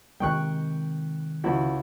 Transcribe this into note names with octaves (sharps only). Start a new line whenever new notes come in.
C3 D#3 G#3 G5 C#6 F#6
C#2 E4 F#4